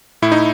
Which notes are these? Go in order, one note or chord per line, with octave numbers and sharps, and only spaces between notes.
A2 E4
D#4